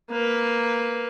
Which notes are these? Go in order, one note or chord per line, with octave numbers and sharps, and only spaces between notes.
A#3 B4